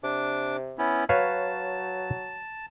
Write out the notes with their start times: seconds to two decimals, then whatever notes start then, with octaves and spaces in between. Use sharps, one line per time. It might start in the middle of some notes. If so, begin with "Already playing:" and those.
0.04 C3 D4 D6
0.78 B3 C#4 E4
1.09 F#3 B4 C#5 F5 A5